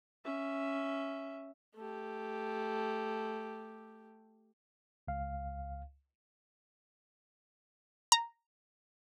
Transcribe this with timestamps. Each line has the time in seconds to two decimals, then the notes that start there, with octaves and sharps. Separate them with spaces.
0.24 C#4 E5
1.75 A3 G4
5.08 C#2 F5
8.12 A#5